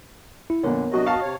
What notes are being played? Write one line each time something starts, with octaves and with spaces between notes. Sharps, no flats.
E4
F2 A#2 D3 B3 A#4 C#5
C3 F#3 D4 F#4 D#5
F5 A5 C#6
C3 C#5